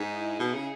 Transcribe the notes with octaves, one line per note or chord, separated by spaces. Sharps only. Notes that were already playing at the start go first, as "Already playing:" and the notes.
Already playing: G#2 D#4
E4
B2 G#4
C#3